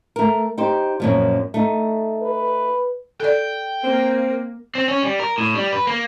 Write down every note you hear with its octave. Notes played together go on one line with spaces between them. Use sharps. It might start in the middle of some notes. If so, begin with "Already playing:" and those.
A3 A#4
D#4 G4 C5
F#2 A#2 F3
A3 D#4
B4
A4 D5 G5
A#3 C4
C4
C#4
G3
A#4
A2
G3
B4
A#3